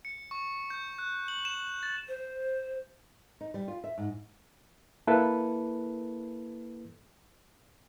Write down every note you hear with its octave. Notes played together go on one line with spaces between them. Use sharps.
C#7
C#6
G6
F#6
F#7
E7
A6
C5
D#4
G3
F4
E5
G#2
A#3 E4 A4 B4